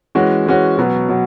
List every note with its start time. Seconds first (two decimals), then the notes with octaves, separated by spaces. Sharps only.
0.15 E3 G#3 C#4 F#4
0.46 E3 G#3 C#4 F#4
0.78 B2 F#3 B3
1.09 B2 F#3